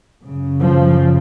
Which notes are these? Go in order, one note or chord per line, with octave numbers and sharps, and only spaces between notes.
F#2 C#3
F3